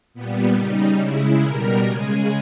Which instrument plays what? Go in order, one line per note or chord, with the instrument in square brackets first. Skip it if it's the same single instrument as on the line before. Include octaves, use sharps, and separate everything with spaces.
[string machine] A#2 G3 B3
C#3 G3 D#4
C#3 G#3 E4
B2 G3 A#4
C#3 G#3 G#4